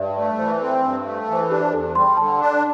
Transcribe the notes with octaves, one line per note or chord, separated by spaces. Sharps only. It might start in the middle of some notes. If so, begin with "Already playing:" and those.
Already playing: G2 D5 E5
A3 D5
E3 C5
C5
C4 A4
G2
A3
E3 C5
A4
D4 G4
C5
E2 A4
G3 C6
D3 A5
D4